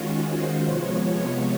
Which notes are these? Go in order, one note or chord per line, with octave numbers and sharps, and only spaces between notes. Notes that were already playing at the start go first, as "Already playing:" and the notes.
Already playing: D#3 G#3 C#4 F4 F#4
C5
C3 F3 G#3 B3 C#5